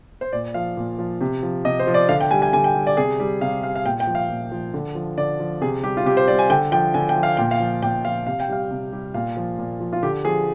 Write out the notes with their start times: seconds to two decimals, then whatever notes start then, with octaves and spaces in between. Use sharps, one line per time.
0.21 C5
0.33 A#2 D5
0.54 F3 F5
0.77 A#2
0.99 F3
1.21 C3
1.43 F3
1.65 C3 D#5
1.79 C5
1.87 F3
1.94 D5
2.09 D3 F5
2.20 G5
2.31 G3 G#5
2.42 G#5
2.53 D3 G#5
2.64 G5
2.75 G3
2.87 D5
2.97 C3 G#4
3.19 G3
3.41 C3 F5
3.63 G3 F5
3.76 F5
3.86 A#2 G5
4.00 G5
4.07 F3
4.15 F5
4.29 A#2
4.52 F3
4.74 D3
4.95 F3
5.18 D3 D5
5.39 F3
5.61 C3 G#4
5.83 G3 G4
5.97 F4
6.05 C3 G4
6.17 C5
6.28 G3 D5
6.39 G#5
6.50 D3 G5
6.72 F3 G5
6.94 D3 G#5
7.09 G5
7.16 F3
7.23 F5
7.37 A#2 G5
7.51 F5
7.60 F3
7.82 A#2 G5
8.04 F3 F5
8.26 C3 F5
8.40 G5
8.48 G3 F5
8.71 C3
8.92 G3
9.14 A#2 F5
9.37 F3
9.59 A#2
9.80 F3
9.93 F4
10.03 D3 G4
10.25 F3 G#4